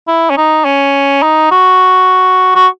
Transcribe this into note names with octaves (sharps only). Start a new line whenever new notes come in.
E4
C#4
D#4
C#4
D#4
F#4
F#4